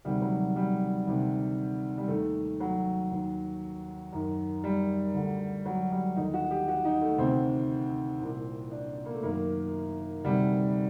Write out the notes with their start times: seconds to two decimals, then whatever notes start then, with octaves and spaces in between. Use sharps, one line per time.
0.05 D2 C3 D#3 G3
0.22 F#3
0.56 G3
1.07 D2 C3 D#3
1.98 G3
2.08 D#2 D#3 A3
2.60 F#3
3.11 D#2 D#3
4.12 F#2 D#3
4.64 G3
5.15 D2 D3
5.66 F#3
5.92 G3
6.16 D#2 D3 D#4
6.34 F#4
6.51 G4
6.68 F#4
6.85 D#4
7.01 A3
7.18 D2 C3 D#3 C4
8.21 C2 A#2
8.71 D4
9.06 A#3
9.14 A3
9.23 F#2 D#3 A#3
10.24 D2 C3 D#3 G3